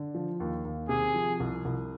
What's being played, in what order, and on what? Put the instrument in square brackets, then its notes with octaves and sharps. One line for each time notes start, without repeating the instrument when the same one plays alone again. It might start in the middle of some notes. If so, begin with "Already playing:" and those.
Already playing: [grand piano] D3
F3
D#2
D#2
[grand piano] C3 [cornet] G#4
[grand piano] F3
C2
C2